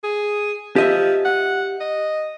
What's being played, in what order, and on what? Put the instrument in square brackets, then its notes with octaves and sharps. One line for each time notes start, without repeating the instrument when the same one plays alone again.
[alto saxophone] G#4
[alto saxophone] F3 [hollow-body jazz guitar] G4 D#5 E5
[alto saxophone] F#5
D#5